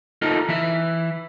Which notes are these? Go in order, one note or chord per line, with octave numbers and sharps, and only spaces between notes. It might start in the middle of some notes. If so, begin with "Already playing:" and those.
D#4 F4 A4 A#4 D#5
E3 E4 E5